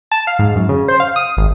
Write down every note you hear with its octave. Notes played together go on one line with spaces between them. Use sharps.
A5
F5
G#2
F#2
C#3
C5
F5
D#6
G#1